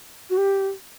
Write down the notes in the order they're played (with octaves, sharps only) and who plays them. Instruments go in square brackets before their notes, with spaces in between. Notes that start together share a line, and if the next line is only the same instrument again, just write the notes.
[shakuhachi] F#4
G4